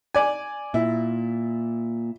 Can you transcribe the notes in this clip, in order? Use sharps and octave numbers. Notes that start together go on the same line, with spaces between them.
D5 G#5
A#2 E4